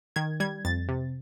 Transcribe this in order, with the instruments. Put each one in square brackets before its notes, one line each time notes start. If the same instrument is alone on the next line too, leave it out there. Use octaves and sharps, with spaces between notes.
[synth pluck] D#3 G#6
G3 G#6
F2 A6
C3